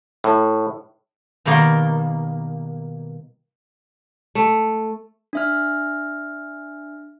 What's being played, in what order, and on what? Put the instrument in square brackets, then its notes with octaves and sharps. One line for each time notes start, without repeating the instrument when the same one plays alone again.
[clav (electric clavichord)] A2
[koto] B2 D#3 G3 A#3
[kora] A3
[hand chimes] D4 E5 F6